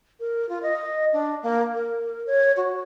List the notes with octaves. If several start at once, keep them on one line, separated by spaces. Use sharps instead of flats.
A#4
F4
D#5
D4
A#3
A#4
C#5
F#4